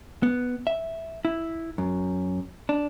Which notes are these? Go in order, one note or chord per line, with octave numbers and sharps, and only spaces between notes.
B3
E5
E4
F#2
D4